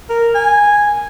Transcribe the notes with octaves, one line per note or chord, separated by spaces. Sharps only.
A#4
G#5